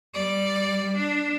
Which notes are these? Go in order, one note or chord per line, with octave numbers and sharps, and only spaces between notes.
G3 D5
D4